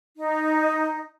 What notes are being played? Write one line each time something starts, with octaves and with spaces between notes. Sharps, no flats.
D#4